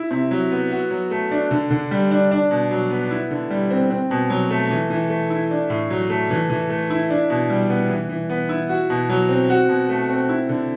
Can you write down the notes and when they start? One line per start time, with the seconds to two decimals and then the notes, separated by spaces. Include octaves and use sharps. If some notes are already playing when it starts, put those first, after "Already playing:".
Already playing: E4
0.11 C3
0.31 F#3
0.51 B3
0.71 F#4
0.91 F#3
1.11 A3
1.31 D4
1.51 D3
1.70 D3
1.91 G3
2.11 D4
2.31 D4
2.51 B2
2.71 F#3
2.91 B3
3.11 E4
3.31 D3
3.50 G3
3.70 C4
3.91 C4
4.11 B2
4.30 F#3
4.50 A3
4.70 E3
4.90 E3
5.10 A3
5.30 E4
5.51 D4
5.70 A2
5.90 F#3
6.10 A3
6.30 E3
6.50 E3
6.70 A3
6.90 E4
7.10 D4
7.30 B2
7.50 G3
7.70 B3
7.90 E3
8.09 E3
8.30 B3
8.49 E4
8.69 F#4
8.90 B2
9.10 F#3
9.29 C4
9.50 F#4
9.69 B2
9.89 A3
10.09 C4
10.29 E4
10.49 D3